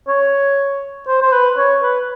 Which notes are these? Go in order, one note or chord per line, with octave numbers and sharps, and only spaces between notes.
C#5
C5
C5
B4
C#5
B4